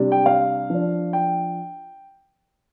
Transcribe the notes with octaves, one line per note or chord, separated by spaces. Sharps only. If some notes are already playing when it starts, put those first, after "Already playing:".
Already playing: C3 G3 D4
G5
F5
F3 D4
G5